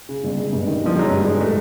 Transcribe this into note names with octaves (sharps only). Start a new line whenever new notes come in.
C#3
G1
G#3
G2
D#3
G1 F3
F#3 G#3
G2 G3
D#3 G#3
A2 A3